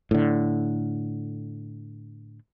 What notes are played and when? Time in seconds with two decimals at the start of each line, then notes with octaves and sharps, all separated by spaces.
0.11 A2 D3